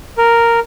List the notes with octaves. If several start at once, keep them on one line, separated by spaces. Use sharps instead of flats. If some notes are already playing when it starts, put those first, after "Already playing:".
A#4